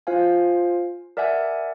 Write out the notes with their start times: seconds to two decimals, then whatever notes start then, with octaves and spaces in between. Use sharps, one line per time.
0.07 F4 C5 F5 G#5
1.17 A#4 D5 E5 F#5 G#5